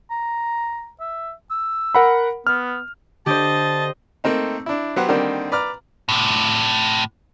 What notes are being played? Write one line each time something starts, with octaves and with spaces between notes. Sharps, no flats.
A#5
E5
E6
A#4 F#5 B5
B3 F6
D3 G4 C5 D#5 A5
A3 A#3 C4 D#4
D4 E4
F#3 B3 G4 C5 F#5
D3 D#3 G3 A#3 C4
B4 D5 A#5 F6
A2 C3